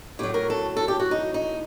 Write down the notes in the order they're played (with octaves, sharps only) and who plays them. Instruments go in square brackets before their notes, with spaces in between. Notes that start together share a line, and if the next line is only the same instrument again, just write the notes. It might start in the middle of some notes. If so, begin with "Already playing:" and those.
[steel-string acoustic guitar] A2 F#3 G4
A#4
A4
A4
G4
F#4
D#4
D#4